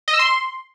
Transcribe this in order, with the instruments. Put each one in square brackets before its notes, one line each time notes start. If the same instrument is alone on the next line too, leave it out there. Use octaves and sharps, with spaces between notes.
[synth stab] D#5
E6
C6